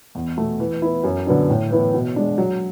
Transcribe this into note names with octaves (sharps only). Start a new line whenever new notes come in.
E2
B2 A3
E3
B3 E4
F#2
D3 F#3 B3 D4
A2
E3 B3 E4
B2
G#3 D4
F#3